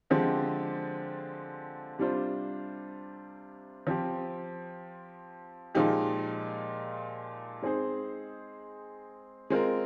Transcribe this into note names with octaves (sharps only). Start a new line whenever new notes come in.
D3 F3 G#3 C4 G4
C3 G3 D4 F4 C5
F3 C4 G4
A#2 F3 G#3 D#4 G4
G#3 C4 D#4 G#4 C5
G#3 C4 F4 A#4